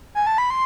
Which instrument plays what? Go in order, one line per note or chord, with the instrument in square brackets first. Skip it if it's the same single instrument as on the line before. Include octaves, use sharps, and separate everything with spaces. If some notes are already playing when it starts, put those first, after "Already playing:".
[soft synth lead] G#5
A5
B5
C6